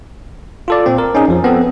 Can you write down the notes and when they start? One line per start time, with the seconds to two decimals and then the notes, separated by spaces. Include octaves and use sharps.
0.68 F4 A4 D5
0.86 A#2 C4
0.98 A#4
1.15 C#4 D#4 G#4
1.28 F2 F3
1.44 B3 C4 A4